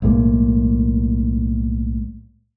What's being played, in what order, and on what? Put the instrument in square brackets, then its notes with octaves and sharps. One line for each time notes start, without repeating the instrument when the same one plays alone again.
[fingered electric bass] B1 A2 G#3 A#3